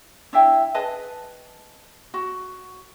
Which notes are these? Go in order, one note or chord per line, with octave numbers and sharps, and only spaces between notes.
D4 E4 E5 G5
G#4 B4 D#5 A5
F#4